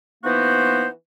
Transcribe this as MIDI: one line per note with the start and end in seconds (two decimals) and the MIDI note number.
0.24 0.87 52
0.24 0.87 58
0.24 0.87 59
0.24 0.87 63
0.24 0.87 66
0.24 0.87 72